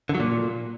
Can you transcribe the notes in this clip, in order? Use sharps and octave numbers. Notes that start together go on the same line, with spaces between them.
D3
F#3
A#2